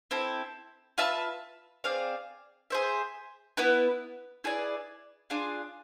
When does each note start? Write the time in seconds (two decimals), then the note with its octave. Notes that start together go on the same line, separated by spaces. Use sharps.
0.11 C4 E4 A4
0.98 F4 B4 E5 A5
1.84 C4 G#4 D5 F5
2.70 G#4 C5 E5
3.57 B3 E4 B4
4.44 E4 G#4 B4 D5
5.30 D4 F4 G#4